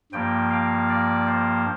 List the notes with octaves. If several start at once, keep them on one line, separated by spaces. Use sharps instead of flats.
G2 F3 A#3 G5
F5
D5
C5